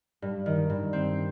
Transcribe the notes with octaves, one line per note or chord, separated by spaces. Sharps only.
G2
D#3
G2
C4